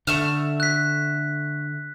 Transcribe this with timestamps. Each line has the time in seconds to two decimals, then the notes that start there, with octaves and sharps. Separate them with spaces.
0.07 D3 A3 E5 F6
0.60 F#6 B6